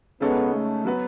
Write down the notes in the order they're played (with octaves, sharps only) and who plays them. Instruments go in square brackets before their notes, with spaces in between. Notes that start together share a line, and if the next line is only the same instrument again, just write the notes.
[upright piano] C#3 G#3 D#4 A4 C#5 [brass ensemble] B3
[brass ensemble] A3
[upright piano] F#3 B3 F#4 B4